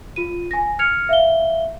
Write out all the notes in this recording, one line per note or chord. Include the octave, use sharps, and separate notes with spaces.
F4 D#7
G#5 A#6
F6 G#6 C#7 F7
E5 F5 G7